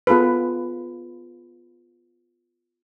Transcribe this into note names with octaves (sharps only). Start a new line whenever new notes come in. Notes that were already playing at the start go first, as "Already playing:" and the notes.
B3 F4 G#4 A4 B4